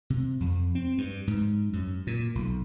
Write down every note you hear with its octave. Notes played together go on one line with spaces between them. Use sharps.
C3
F2
C4
G2
G#2
F#2
A#2
B1